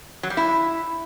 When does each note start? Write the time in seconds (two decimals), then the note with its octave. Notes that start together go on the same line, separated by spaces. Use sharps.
0.23 F#3
0.30 G3
0.37 E4